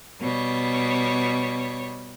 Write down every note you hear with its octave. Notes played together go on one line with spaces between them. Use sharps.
B2 G3 C#5